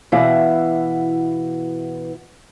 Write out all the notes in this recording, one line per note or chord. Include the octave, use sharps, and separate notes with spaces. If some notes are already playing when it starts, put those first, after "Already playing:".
B2 E3 E4 F5 F#5